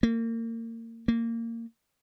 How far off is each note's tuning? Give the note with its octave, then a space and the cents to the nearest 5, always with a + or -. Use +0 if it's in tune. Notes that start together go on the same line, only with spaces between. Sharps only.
A#3 -30
A#3 -20